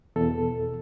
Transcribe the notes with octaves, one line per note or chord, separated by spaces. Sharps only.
E2 B2 A4